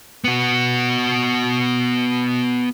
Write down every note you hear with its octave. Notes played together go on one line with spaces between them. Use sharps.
B3 F#4